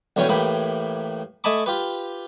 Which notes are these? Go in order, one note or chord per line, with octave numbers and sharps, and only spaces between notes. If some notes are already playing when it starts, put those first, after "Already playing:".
B1 D3 E3 C#4 C#5 G5
A2 E3 A#3 G4 B5
A3 D#5 G#5 A5 B5 D6
F4 G4 B4